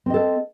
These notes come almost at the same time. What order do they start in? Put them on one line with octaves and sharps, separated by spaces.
C4 D#5 A4